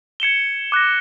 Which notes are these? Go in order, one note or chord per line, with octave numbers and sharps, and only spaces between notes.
G#6 C#7 E7 G7
D6 F#6 A#6